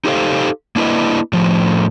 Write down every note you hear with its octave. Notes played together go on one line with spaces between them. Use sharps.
D#4 G4 A4 C5 F5
A#3 D4 E4 B4 D#5
A2 F3